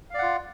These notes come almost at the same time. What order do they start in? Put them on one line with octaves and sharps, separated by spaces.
F5 D5 F#5 F4